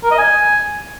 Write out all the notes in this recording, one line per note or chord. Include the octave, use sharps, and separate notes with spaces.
A#4
D#5
G#5